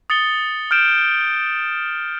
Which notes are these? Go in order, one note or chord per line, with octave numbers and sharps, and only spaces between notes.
D#6 A6 C#7 G7
F6 G6 D7 E7